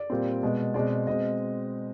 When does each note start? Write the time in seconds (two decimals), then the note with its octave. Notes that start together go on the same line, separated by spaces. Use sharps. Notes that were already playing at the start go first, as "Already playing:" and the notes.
Already playing: D5
0.10 A#2 G3 C4
0.43 B2 G#3 B3
0.74 B2 G#3 C4 D5
1.07 B2 G#3 C4 D#5